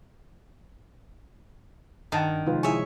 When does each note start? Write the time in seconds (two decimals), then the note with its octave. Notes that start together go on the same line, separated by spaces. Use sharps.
2.12 G2 D#3 D4 F#5 A5 A#5
2.46 C3 F3 G#3 D#4 F4 B4
2.63 E4 G#4 C#5 E5 G#5